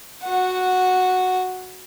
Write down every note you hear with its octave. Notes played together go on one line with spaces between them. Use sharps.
F#4 F#5